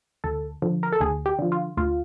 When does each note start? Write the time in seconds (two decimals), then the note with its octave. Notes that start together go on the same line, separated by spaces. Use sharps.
0.24 D2 A4
0.62 D3 F3
0.83 A#4
0.92 A4
1.01 D2 G#4
1.26 G4
1.39 D3 F3
1.52 F4
1.77 D2 F4